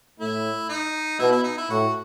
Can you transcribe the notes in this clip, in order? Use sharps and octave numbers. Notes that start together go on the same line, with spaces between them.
A2 E4
D#4
B2 E4
E4
D#4
E4
A2 F#4